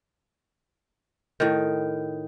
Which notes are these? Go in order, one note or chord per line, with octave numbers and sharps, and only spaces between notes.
A2 D#3